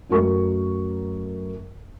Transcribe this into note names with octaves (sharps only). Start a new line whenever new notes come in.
F#2 F#3 A3 A#4 C#6